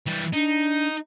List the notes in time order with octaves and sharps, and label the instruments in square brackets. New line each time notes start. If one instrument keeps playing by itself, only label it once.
[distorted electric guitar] E3 G3
[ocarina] D4 [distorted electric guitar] D#4